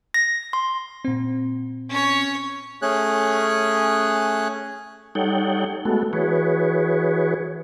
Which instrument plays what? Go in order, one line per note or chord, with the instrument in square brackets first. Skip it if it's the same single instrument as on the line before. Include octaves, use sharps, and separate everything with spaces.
[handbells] A#6
C6
[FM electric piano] A#2 C4
[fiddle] C#4 C#5
[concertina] A3 C#4 G#4 C#5 F#6
[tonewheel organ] G3 D#4 A4 C#5 F#5 G5
G#3 A3 B3 F#4 A4
E3 F#4 G#4 B4 C#5